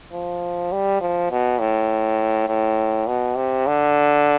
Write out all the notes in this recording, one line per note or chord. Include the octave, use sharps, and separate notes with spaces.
F3
G3
F3
B2
A2
A2
B2
C3
D3